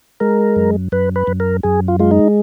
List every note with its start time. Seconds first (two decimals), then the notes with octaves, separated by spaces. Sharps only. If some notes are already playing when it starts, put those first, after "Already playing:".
0.20 G#3 A#4
0.56 F#2
0.92 F#2 B4
1.16 B4
1.27 F#2
1.40 A#4
1.63 F#2 G#4
1.88 F4
1.99 G#3 F4
2.11 D#4